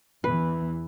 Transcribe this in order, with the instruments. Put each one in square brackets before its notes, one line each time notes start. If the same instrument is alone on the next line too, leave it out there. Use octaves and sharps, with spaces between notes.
[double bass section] E2 E3 [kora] B4